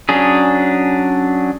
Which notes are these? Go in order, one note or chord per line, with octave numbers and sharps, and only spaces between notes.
F#3 C#4 D4 G#4